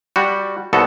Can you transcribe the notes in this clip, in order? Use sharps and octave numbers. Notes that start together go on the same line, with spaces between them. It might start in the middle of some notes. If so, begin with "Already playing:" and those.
G3 F#4
C2 B3 F#4 A4